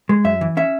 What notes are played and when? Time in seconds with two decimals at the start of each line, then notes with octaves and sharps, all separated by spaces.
0.09 G#3
0.24 F#2 E5
0.41 E3
0.57 C#4 E5